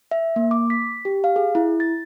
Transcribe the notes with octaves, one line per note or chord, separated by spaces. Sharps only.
E5
A#3
D6
B6
G4
F5
G#4
E4
A6